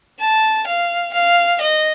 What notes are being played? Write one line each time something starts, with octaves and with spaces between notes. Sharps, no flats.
A5
F5
F5
D#5